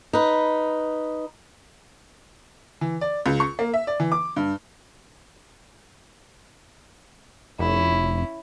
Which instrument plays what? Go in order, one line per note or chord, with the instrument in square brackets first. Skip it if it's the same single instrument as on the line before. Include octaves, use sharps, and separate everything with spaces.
[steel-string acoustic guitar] D#4 B4
[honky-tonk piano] E3
D5
C#2
C#6
A#3
E5
D5
E3
D6
G2
[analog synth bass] F1 [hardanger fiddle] C#4 E4